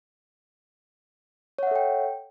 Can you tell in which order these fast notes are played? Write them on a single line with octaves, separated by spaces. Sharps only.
C#5 F#5 E5 A4 G5